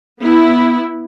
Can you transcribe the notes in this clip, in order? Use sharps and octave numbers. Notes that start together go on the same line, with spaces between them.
B3 E4